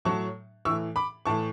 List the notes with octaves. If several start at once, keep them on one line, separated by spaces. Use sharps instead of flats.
A2 F#3 A5 C#6
A2 E3 C#6 E6
B5 D6
A2 E3 A5 C#6